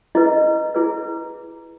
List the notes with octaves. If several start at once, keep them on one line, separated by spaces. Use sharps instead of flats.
E4 G#4 B4 D#5
E4 G#4 B4